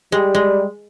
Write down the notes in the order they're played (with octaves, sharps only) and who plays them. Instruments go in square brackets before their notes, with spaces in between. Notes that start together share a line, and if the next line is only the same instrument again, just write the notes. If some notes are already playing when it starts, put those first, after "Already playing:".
[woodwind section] G3 [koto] G#3
[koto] G#3